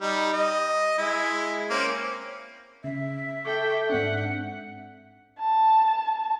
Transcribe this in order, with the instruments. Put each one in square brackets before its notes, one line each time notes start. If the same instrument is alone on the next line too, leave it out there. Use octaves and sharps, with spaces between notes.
[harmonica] G3 D#4
D#5
G#3 E4
A#3 C4 C#4
[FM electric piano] C#3 [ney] E5
[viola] A4 G5 [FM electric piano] C#6 D6 G6
[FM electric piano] G#2 C4 D4 [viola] F#5
[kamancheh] A5